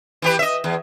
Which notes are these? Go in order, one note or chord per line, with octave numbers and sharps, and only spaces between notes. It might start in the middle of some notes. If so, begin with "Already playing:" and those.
E3 G4 B4
D#5 E5
E2